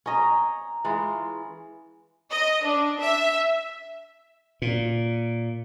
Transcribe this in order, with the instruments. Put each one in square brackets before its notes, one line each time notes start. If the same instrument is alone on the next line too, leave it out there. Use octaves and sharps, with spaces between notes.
[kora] C#4 D#5 [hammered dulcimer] A#5 C#6
[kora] E3 G#3 F4
[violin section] D#5
D4
E5
[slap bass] A#2